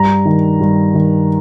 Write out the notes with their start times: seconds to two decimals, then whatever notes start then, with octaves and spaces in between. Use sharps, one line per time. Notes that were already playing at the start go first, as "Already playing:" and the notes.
Already playing: G2 A#5
0.25 D#3
0.60 G2
0.94 D#3